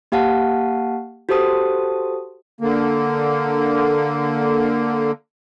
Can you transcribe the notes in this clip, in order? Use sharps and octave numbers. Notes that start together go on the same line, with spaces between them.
A#3 G4 F5 F#5 A5
F#4 G4 A4 C5 A5 D#6
D3 A#3